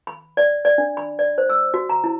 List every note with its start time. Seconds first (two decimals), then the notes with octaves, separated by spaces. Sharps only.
0.07 B5
0.37 D5
0.65 D5
0.78 D4
0.97 B5
1.19 D5
1.38 C5
1.50 E6
1.74 F#4
1.89 A#5
2.04 E4